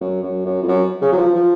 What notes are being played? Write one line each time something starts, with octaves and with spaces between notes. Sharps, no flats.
F#2
F#2
F#2
F2
F#2
C#3
F#3
F3
F3